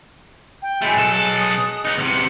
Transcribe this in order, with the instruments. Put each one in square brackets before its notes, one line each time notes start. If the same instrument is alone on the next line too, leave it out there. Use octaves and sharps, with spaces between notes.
[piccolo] G5
[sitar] F#3 G#3 [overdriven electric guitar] A3 E4
[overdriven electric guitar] B1 A4 [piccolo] E7
[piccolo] D#6
[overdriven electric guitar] B3 D#4 [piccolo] C#7
[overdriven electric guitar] E2 C3